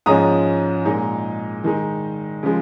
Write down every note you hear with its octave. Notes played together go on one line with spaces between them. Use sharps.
G#2 F3 G#3 C#4 A#5 D#6
A#2 G#3 D#4
D#3 G#3 D#4
C#3 F3 G#3